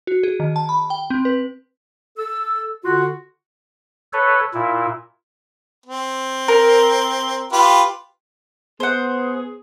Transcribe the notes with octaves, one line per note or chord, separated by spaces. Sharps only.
F#4
G#4
D#3
A5
B5
G5
C4
B4
A4 E6
D3 F4 F#4
A4 B4 C#5
A#2 E4
C4
A#4
F4 G4 B4
B3 G#4 C5 F#5